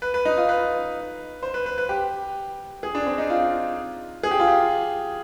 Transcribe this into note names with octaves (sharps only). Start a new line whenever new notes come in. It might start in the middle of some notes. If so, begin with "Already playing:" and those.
B4
B4
D#4
F4
B4
C5
B4
B4
B4
G4
G#4
D4
C4
D#4
F4
G#4
G4
F4
G4